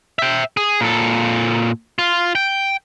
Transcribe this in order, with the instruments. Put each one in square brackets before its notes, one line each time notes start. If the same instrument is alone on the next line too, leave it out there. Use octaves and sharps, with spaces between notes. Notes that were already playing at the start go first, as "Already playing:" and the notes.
[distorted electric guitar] E5 G5
G#4
A#2 A4
F4
G5